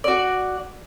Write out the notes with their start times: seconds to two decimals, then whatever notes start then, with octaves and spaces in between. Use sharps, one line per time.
0.04 F#4 D5